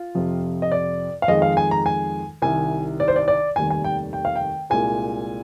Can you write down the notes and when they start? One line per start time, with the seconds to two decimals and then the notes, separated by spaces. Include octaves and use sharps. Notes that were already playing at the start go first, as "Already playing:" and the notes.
Already playing: F4
0.15 F2 C3 F3
0.62 D#5
0.72 D5
1.22 F5
1.28 F2 D#3 G#3 D#5
1.42 F5
1.57 G#5
1.71 A#5
1.86 G#5
2.42 C2 C3 D#3 G#5
3.00 D5
3.08 C5
3.16 D5
3.28 D5
3.56 F1 D#2 D#3 G3 G#5
3.70 G#5
3.84 G5
4.13 G5
4.25 F5
4.36 G5
4.70 C2 A#2 G#3 G#5